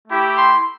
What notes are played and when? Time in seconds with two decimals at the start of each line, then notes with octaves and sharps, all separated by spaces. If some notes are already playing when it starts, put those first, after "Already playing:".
0.08 A3 E4 G4
0.37 C6